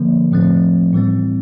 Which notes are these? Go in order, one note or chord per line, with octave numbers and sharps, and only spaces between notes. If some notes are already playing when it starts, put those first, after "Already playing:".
Already playing: D3 F3 A#3
A2 F3 A3 C4
A2 E3 G3 C4